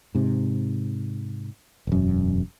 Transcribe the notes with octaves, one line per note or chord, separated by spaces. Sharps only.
G#2 C3
E1 F#2